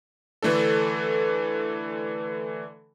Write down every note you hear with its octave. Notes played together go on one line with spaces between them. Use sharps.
D3 E3 A3 D4 A4